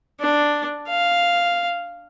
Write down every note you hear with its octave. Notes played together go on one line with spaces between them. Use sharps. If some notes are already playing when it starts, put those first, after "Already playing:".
D4
F5